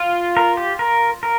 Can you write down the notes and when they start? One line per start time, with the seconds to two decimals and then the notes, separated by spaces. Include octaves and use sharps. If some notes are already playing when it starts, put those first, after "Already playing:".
Already playing: F4
0.37 A#4
0.57 G4
0.79 A#4
1.23 A#4